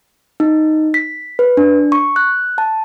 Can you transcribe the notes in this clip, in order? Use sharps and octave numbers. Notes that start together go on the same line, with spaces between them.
D#4
B6
B4
D4
C#6
F#6
A5